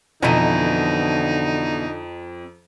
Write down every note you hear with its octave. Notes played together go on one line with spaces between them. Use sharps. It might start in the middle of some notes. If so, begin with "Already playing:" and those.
F2 B2 D3 E3 D#4 A#5 D#7